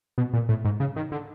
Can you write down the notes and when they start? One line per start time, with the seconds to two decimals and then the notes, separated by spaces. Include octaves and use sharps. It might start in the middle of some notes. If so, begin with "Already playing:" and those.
0.18 B2
0.33 A#2
0.49 A2
0.65 G#2
0.80 C#3
0.96 D#3
1.12 D3